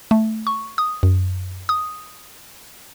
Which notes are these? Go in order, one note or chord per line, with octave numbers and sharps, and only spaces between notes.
A3
C#6
D#6
F#2
D#6